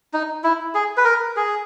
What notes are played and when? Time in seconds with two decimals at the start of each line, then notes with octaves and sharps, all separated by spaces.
0.13 D#4
0.44 E4
0.75 G#4
0.97 B4
1.05 A#4
1.36 G#4